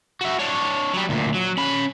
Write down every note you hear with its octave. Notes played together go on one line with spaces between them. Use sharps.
F#4 E5
D4 C#5
F#3 G3
D2 A#2
F#3
C#4 B5